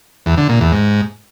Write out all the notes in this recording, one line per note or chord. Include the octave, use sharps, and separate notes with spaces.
E2
D3
A#2
E2
G#2